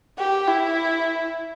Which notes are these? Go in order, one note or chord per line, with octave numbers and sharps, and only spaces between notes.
G4
E4